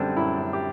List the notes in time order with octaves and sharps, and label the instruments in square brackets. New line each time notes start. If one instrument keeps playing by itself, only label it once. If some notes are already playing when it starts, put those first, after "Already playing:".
Already playing: [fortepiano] F#2 D3 G3 C4 D4
F#2 E4
F#2
G4